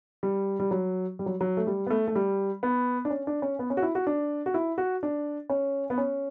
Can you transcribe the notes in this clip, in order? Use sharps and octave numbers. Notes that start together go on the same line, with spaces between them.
G3
G3
F#3
G3
F#3
F#3
A3
G3
B3
A3
A3
G3
B3
D4
C#4
D4
C#4
B3
C#4
F#4
E4
F#4
D4
F#4
E4
F#4
D4
C#4
B3
C#4